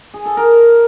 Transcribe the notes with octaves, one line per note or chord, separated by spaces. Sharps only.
G#4
A4
A#4